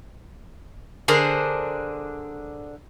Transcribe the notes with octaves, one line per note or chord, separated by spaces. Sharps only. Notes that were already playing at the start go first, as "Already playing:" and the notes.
D3 D4 G#4 A#4 C5